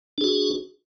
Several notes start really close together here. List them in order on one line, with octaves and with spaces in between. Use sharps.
D4 G#4 F#4